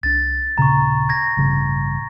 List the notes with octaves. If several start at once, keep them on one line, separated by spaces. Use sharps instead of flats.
C2 D4 A6
D#1 A#2 C#3 A#5 C#6
G#6 A#6
A1 G2 C#3